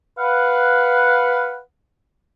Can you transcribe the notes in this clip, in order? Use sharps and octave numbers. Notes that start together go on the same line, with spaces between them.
B4 F5 F#5